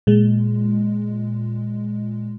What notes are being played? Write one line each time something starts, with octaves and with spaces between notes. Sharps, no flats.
A#2 G#3